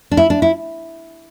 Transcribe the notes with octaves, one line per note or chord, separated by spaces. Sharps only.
D4
E4
D4
E4